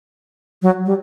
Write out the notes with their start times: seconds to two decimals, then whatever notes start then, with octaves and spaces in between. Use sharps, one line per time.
0.62 F#3
0.86 G3